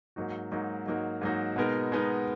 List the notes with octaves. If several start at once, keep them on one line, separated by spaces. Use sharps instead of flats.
G#2 F#3 A#3 D#4 F#4
G#2 F#3 A#3 D#4 F#4
G#2 F#3 A#3 D#4 F#4
G#2 F#3 A#3 D#4 F#4
B2 G#3 B3 D#4 A#4
B2 G#3 B3 D#4 A#4